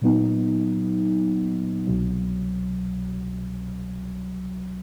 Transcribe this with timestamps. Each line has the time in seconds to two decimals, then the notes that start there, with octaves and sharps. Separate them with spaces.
0.02 A#2 F#3 B3 D#4
1.87 C2 B2 F#3